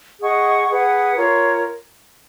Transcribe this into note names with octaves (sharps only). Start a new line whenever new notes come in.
G#4 D#5 F#5 C#6
G#4 B4 F#5
F4 A#4 C#5